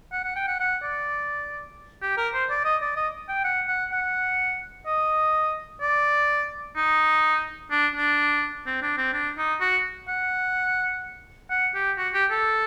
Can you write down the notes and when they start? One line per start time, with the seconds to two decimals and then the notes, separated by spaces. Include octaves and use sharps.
0.12 F#5
0.24 F#5
0.36 G5
0.47 F#5
0.60 F#5
0.83 D5
2.02 G4
2.17 A#4
2.34 C5
2.50 D5
2.65 D#5
2.82 D5
2.97 D#5
3.29 G5
3.44 F#5
3.68 F#5
3.92 F#5
4.87 D#5
5.81 D5
6.76 D#4
7.71 D4
7.95 D4
8.66 C4
8.82 D4
8.97 C4
9.13 D4
9.38 D#4
9.60 F#4
10.08 F#5
11.50 F#5
11.75 G4
11.97 F#4
12.14 G4
12.30 A4